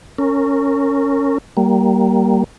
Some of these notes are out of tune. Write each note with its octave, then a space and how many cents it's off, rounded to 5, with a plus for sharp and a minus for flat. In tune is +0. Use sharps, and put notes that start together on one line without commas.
C#4 +0 A#4 -25
G3 -20 A#3 +0